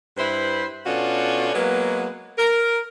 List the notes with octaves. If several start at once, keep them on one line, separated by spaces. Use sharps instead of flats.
G2 E4 B4 C5
B2 C#4 D4 F4 F#4 A4
F#3 G#3 A#3 B3 B4
A#4